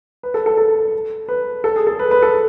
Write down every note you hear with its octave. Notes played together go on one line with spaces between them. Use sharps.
B4
A4
A4
A4
B4
A4
G#4
A4
B4
B4
A4